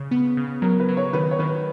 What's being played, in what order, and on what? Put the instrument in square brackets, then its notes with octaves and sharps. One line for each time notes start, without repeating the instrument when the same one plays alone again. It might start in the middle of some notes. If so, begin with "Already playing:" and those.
Already playing: [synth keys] C#3
B3
C#3
[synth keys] F#3 [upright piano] A#4
[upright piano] B4
[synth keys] F#3
[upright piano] C#5
[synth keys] D#3 [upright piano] B4
[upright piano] C#5
[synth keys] D#3 [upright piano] B4